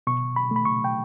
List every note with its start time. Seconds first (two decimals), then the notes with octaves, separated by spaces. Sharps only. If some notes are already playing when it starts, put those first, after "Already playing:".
0.07 B2 C#6
0.36 B5
0.51 A3
0.56 B5
0.65 C#6
0.84 G5